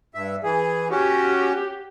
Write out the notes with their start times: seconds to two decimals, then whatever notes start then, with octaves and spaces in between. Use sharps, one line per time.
0.15 G2 E5
0.43 E3 G#4
0.90 C#4 F#4 G4